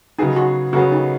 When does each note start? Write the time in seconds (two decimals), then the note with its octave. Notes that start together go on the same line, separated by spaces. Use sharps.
0.19 C#3 F#3 B3 D#4 G#4
0.36 F#4
0.73 C#3 F#3 B3 F#4 G#4
0.92 D#4